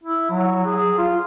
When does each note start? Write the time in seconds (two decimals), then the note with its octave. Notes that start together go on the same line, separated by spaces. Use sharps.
0.03 E4
0.31 F#3
0.65 G#4
0.98 F4